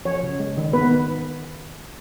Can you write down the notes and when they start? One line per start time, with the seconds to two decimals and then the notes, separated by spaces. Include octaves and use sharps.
0.05 F3 C#5
0.23 C#3
0.39 G#3
0.57 D#3
0.73 B3 B4
0.91 D#3